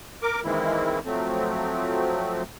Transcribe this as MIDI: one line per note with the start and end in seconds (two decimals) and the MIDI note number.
0.22 0.41 70
0.22 0.41 86
0.44 1.00 51
0.44 1.00 52
0.44 1.00 56
0.44 1.00 58
0.44 1.00 60
0.44 1.00 64
1.05 2.42 53
1.05 2.42 54
1.05 2.42 57
1.05 2.42 60